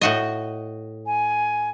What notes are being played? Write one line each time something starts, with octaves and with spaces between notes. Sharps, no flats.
A2 F#4 D#5
G#5